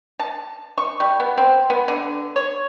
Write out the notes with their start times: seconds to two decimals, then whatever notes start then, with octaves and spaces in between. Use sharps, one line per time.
0.20 A5
0.78 C#6
1.00 G3
1.20 B3
1.38 C4
1.70 B3
1.88 D3
2.36 C#5